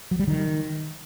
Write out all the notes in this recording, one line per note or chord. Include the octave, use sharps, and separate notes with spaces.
F#3
G3
D#3